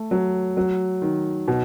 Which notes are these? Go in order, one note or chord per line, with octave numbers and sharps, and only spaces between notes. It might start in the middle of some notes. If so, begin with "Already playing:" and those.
Already playing: A3
F#3
F#3
D#3
B2